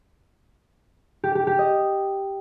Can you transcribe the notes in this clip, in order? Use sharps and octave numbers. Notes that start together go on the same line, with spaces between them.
G4
G4
G4
D#5